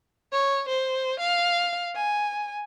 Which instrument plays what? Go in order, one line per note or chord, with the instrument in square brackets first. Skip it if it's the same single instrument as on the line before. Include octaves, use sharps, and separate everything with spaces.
[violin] C#5
C5
F5
G#5